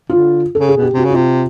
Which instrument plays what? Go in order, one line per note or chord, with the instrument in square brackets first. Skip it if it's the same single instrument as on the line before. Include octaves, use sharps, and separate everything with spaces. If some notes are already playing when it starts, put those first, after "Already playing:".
[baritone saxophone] D3 [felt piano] F4
[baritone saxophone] C#3 [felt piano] A4
[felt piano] G#4
[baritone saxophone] B2
[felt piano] G4
[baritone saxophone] C3 [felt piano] F#4
[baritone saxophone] C#3
[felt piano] F4
[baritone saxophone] C3